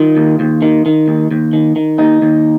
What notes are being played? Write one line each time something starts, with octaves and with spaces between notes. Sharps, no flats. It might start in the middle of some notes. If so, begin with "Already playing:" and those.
Already playing: D#3 F4
D#2
D#2
D#3
D#3
D#2
D#2
D#3
D#3
D#2 D#4
D#2